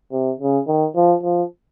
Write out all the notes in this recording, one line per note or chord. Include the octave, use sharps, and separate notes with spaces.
C3
C#3
D#3
F3
F3